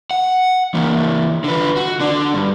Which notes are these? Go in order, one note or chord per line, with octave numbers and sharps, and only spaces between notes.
F#5
E3 A#3
D3 B4
F#4
D3 D4
G2